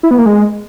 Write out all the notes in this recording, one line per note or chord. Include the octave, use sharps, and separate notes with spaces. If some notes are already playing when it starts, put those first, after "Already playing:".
E4
B3
A#3
G#3